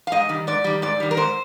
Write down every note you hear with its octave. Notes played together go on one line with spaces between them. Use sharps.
F5
G#2 D#5
D#3 G3
G#2 D5
D#3 G3
G#2 D5
D#3 G3
A#4
G#2 C5